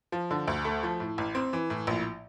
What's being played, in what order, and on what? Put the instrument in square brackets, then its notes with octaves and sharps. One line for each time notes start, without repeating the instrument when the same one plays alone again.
[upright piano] F3
D3
D2
A3
F3
A2
A1
C4
E3
A2
A#1